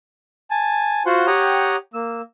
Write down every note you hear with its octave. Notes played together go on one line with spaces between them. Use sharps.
G#5 A5
F4 F#4 C5 F#5 C6
G4 C#5 F#5 G5 A#5 D#6
A#3 E6